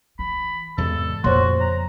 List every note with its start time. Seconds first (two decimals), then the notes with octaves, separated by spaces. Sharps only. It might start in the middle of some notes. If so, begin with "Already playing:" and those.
0.19 E3 B5
0.78 E2 G#2 C3 G#3 A4
1.24 F2 A#2 C#3 F#4 C5 C#5 C6
1.60 A#5